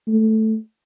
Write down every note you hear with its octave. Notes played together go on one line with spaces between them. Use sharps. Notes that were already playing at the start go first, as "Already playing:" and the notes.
A3